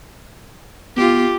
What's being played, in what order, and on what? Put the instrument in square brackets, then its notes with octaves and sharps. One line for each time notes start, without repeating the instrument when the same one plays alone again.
[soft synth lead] B3 [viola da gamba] F4 G4